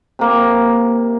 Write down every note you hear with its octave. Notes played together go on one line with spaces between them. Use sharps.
C3 A#3